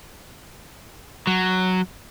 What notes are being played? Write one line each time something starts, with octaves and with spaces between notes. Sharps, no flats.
F#3